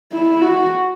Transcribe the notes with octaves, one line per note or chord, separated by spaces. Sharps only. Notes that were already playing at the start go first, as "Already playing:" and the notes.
E4
F#4